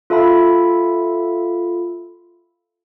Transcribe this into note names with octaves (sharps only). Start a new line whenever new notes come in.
F4 A4 E5 F5 B5